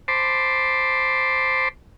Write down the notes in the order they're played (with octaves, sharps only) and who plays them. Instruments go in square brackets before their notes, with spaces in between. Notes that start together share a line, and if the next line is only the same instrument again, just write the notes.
[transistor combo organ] C5 A5 B5 C6 D6